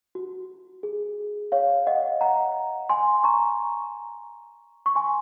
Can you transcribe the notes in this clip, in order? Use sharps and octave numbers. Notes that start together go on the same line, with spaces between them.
F#4
G#4
C#5 F5
D#5 F#5
F#5 A#5
G#5 C6
A#5 C#6
C#6
G#5 C6